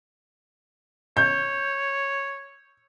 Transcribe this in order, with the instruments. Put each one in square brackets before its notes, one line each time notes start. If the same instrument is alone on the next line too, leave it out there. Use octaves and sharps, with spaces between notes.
[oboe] C#5 [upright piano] G6